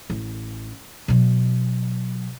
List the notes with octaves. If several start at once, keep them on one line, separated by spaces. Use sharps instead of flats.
A1
B2 F#3